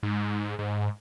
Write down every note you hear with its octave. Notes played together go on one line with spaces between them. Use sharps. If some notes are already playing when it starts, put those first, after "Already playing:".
G#2
G#2